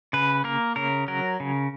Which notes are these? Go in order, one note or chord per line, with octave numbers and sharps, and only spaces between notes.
C#3 B4
A#3 A#4
C#3 A#4
F#3 A#4
C#3